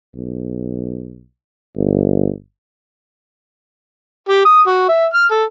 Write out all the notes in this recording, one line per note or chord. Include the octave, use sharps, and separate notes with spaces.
B1
G1
G4
D#6
F#4
E5
F6
A4